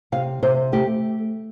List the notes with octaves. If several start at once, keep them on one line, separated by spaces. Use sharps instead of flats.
C3 F5
C3 C5
A3 G4